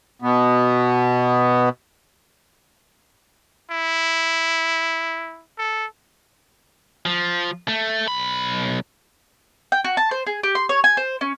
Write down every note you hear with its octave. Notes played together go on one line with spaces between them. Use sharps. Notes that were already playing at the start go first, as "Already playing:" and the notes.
B2 B3
E4
A4
F3
A3
B1 B5
G5
F#4
A5
C5
G#4
G4
C6
C#5
G#5
C5
C#4